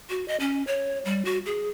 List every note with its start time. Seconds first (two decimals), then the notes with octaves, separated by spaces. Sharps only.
0.10 F#4
0.28 D#5
0.40 C#4
0.67 C#5
1.05 G3
1.25 F#4
1.46 G#4